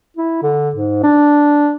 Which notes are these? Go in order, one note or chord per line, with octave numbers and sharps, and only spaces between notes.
E4
D3
G#2
D4